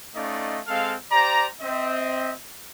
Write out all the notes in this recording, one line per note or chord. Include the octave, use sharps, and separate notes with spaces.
A3 C#4 D#4 D5 D#5 F5
G#3 C4 A4 F5
G4 C5 D5 A#5
C4 D#5 E5